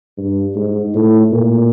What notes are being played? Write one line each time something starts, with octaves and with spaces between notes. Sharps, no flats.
G2
G#2
A2
A#2